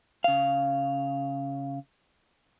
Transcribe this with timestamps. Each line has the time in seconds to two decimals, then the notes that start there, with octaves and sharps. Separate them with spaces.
0.24 C#3 F5